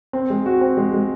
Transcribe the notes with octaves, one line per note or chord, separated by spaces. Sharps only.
C4
G#3
F#4
C4
G#3
G#3